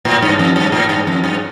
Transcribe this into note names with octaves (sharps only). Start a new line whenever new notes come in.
A2
G2
F2
G2
A2
G2
F2
G2